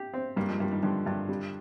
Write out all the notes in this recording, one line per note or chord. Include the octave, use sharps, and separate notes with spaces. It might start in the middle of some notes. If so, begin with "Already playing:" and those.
Already playing: G4
C4
G2 G3 A#3
F3 G#3
G2 G3 A#3
D#3 G3
G2 D3 F3
G2
G3